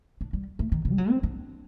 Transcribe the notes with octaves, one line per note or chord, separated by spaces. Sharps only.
D4
G3
A3
D#3
C3
G3
F#3
C4
D4